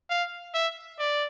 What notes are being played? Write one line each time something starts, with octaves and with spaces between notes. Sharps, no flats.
F5
E5
D5